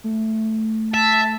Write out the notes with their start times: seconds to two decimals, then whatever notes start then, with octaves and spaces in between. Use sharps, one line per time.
0.04 A3
0.94 E5 A5